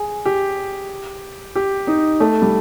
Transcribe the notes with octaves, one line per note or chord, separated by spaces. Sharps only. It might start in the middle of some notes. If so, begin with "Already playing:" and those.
Already playing: G#4
G4
G4
D#4
A3
G3